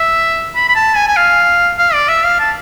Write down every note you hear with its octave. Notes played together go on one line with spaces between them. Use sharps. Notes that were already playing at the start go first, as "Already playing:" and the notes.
Already playing: E5
B5
B5
A5
G#5
G#5
F5
F5
D5
E5
F5
A5